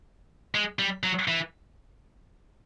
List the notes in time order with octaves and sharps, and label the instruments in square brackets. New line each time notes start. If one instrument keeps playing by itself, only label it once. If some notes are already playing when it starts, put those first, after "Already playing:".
[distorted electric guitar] G#3
G3
F#3
E3